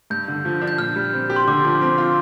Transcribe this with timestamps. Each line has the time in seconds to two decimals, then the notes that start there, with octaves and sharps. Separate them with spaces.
0.10 G2 G6
0.28 D3
0.45 F3
0.62 D4
0.68 G6
0.78 A#2 F6
0.96 G3
1.13 C4
1.30 G4
1.36 C6
1.47 D3 D6
1.64 F3
1.81 C4
1.98 F4